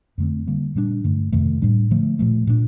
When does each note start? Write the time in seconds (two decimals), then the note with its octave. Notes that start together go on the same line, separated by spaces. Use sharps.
0.18 F2 D3 A3 C4
0.47 D3 G3 A#3
0.75 A#2 G3 A#3 D4
1.04 G2 D3 A3
1.32 F2 C3 D#3 A3
1.62 A2 G3 D4
1.91 D3 F3 A3
2.19 A#2 F3 A3
2.47 A#2 A3 D4